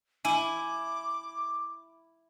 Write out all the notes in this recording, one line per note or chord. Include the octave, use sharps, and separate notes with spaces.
E4 G#5 D6